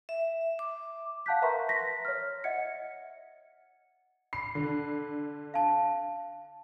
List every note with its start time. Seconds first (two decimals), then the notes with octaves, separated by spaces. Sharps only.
0.09 E5
0.59 D6
1.26 F5 F#5 A5 F#6 G6 B6
1.42 A#4 B4 E5 A#5 C6 C#6
1.69 A#6 B6
2.05 C#5 F6
2.44 D#5 E5 F#5 G#6 C#7
4.33 B5 C7
4.55 D3
5.54 F5 A5